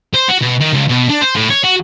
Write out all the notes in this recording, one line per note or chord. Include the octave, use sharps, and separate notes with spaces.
C5
F#4
B2
D#3
C#2
B2
D4
C5
A2
C#5
F#4